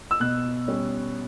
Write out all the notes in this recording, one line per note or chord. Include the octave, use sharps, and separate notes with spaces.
E6
B2 F#6
G3 C#4